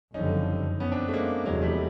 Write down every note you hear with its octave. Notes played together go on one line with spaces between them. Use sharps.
F#1 F2 D3 G3 C#4 D#4
B3 C#4
C4 D4
A3
G#3 A#3
F1 E2 C3 F#3 G#3
G3 A3